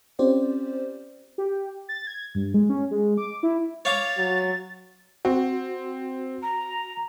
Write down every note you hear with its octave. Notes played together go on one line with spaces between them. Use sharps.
C4 C#4 F4 G4 C5 D5
G4
A6
G#6
G2
G#3
C#4
G#3
D6
E4
C#5 F5 D6 A6
F#3
C4 F#4
A#5